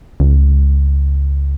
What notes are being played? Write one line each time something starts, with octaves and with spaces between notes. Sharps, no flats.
C#2